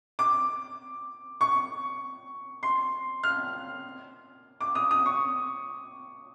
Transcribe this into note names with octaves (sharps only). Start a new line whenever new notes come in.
D6
C#6
C6
F6
D6
D#6
D#6
C#6